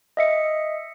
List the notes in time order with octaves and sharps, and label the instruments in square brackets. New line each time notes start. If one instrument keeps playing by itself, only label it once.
[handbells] D#5 E5 C#7